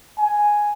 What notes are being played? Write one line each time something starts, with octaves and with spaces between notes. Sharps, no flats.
G#5